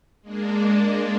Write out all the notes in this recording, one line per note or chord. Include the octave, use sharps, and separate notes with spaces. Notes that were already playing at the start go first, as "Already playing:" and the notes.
G#3 A#3 D4